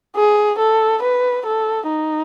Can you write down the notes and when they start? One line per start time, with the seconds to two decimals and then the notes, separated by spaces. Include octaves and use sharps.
0.16 G#4
0.59 A4
1.02 B4
1.46 A4
1.89 D#4